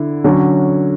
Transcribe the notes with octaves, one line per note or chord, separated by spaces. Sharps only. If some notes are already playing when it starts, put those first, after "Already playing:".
Already playing: D3 E4
D3 F#3 C#4